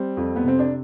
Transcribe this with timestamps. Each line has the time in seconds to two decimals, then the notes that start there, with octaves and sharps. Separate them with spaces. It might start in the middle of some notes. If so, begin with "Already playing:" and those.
Already playing: G3 C4
0.17 F2
0.36 B3
0.44 C3 C4
0.59 D4